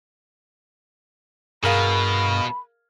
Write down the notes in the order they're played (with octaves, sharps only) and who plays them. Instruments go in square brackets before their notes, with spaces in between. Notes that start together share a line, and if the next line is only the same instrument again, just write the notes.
[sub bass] G2 [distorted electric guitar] B2 [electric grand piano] G#4 A#4 F5 [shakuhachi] B5